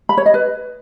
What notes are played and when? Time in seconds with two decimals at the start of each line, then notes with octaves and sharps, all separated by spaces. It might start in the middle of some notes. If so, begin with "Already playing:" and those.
0.09 B5
0.17 C#5
0.26 D#5
0.34 B4